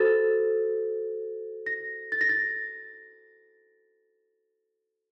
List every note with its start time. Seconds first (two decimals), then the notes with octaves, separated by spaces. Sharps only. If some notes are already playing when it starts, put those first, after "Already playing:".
Already playing: F#4 A4 C5 A6
1.66 A#6
2.12 A6
2.21 A#6
2.29 A6